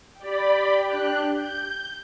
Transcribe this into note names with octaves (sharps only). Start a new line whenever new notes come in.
G4 D5 G5 B5
D4 F#6
G6